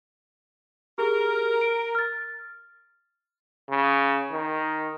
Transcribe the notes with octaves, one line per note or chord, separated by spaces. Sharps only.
G4 G#4 A#4
D7
F6 A6
C#3
D#3